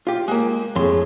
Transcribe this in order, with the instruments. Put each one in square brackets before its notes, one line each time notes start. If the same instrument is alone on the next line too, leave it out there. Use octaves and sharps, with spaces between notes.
[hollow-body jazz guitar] F4 G4
G#3 A#3
[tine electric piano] F2 G#4 [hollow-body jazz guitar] A2 C6